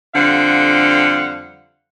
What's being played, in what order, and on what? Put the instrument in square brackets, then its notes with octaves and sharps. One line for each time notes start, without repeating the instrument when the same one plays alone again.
[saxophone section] F2 D3 G3 C5 F5 F#5